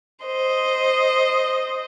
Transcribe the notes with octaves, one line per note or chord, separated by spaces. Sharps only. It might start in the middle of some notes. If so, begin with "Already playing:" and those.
C5 D#5